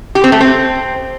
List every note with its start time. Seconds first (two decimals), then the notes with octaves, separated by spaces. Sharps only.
0.15 G4
0.24 C4
0.32 A3
0.41 C4